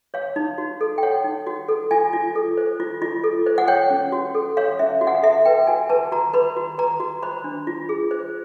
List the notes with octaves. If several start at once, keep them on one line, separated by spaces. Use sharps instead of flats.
C#5 F5
D#4
F#4
A4
G5
C#5 F#5
D#4
F#4
A4
F4 G#5
F4
A4
C5
F4
F4
A4
C5
F#5
C#5 G5
C#4
F#4
A4
C#5 F5
C#4 E5
F#4
F#5
F5
A4 E5
B4 G5
F#4 G#5
B4 A5
F#4 A#5
B4 B5
F#4
B4 A#5
F#4
C5 B5
D4
F4
G#4
C5